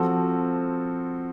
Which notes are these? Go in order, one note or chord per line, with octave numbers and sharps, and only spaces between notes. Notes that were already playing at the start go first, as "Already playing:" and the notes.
Already playing: F3 C4 F#4 A4